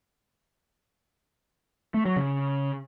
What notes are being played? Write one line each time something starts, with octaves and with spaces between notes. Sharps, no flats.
A3
F#3
C#3